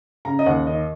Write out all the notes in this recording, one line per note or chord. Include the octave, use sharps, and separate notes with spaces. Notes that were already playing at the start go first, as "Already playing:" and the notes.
C#3 A#5
D#5
D#2 F#5
D#3 D#5